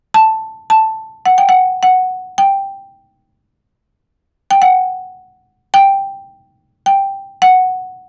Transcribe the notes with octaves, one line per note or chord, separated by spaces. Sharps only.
A5
A5
F#5
G5
F#5
F#5
G5
G5
F#5
G5
G5
F#5